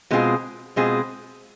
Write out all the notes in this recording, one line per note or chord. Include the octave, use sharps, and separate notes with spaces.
B2 G#3 C4 F4 G#4
B2 G#3 C4 F4 G#4